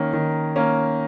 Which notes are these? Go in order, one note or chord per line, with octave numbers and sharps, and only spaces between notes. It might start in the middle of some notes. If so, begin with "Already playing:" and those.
Already playing: D#3 A#3 C#4
D#3
A#3 C#4